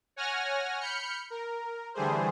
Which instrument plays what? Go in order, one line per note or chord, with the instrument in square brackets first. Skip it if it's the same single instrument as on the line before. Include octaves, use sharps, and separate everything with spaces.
[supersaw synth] C#5 F#5 G#5 F6 A#6
B5 F6 G6 C#7
A#4
D3 E3 G3 A3 G#4 C5